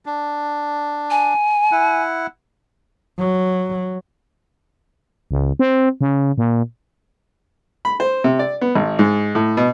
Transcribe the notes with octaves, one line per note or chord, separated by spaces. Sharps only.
D4
G#5
E4 F#5
F#3
C#2
C4
C#3
A#2
B5
C5
C3
D5
B3
G#1
G#2
A2
B2